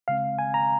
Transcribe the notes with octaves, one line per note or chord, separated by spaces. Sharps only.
C#3 G#3 C4 F5
G#5
A#5